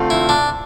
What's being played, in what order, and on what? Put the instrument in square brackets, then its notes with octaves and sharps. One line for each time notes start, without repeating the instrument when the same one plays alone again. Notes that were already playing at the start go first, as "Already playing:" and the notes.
Already playing: [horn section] D3 A3 C4 F4
[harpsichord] E4
D4